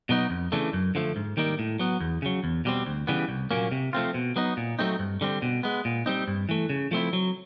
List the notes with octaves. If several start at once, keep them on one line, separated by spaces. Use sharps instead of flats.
B2 F#3 B3 D#4
F2
C#3 E3 A3 D4
F#2
D3 F3 A3
G#2
D#3 G3 A#3 D#4
A2
F#3 B3
E2
C#3 F#3
E2
B2 G3 C4
D2
C#3 E3 G3 B3
C2
A#2 F#3 A#3 C#4
C3
F3 A3 C4 F4
B2
F#3 B3 D#4
A#2
F#3 A3 C4 D#4
G2
D3 G3 C4
B2
G#3 B3
A#2
G3 C4 D#4
G2
E3 A3
C#3
F3 A3 C4 E4
F#3